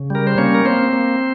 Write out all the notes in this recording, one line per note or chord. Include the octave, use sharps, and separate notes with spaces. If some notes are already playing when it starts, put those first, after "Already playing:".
Already playing: C#3
G3 A#4
C5
A#3 C#4 C#5
A#4
A#3 C4 C5
A#3